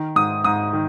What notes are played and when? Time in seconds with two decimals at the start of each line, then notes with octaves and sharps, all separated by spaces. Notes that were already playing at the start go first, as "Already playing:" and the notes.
Already playing: D#3
0.16 G#2 D#6
0.44 G#2 D#6
0.73 D#3